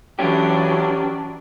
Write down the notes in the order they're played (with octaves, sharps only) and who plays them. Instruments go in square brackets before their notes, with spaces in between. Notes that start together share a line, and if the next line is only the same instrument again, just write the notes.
[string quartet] E3 F#3 D4 [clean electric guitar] C#4 G4